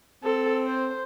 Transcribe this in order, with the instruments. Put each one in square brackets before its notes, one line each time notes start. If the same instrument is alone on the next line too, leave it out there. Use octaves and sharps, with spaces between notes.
[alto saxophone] C4 [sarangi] A4
[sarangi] C5